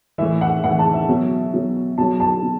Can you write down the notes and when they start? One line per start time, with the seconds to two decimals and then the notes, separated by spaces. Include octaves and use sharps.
0.18 A2 E3 E5
0.41 F#5
0.64 A2 E3 F#5
0.79 A5
0.94 E5
1.09 B2 F#3
1.54 B2 F#3
1.98 B2 F#3 A5
2.20 A5
2.43 B2